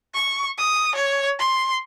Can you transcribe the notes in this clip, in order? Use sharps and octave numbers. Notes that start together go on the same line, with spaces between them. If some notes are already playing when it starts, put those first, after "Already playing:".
C#6
D#6
C#5
C6